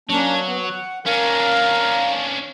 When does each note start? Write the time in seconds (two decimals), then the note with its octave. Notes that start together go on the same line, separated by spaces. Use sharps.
0.09 F#3 A#3 C#4 D4
0.44 B3
0.63 F#5
1.06 C#4 D4 A#4 F5 A#5